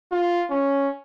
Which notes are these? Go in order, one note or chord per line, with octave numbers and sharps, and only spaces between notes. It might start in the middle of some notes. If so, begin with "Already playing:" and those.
F4
C#4